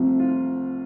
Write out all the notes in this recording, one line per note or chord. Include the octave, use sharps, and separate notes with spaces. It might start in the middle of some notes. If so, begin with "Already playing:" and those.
Already playing: C2 C3 F3 A3
F4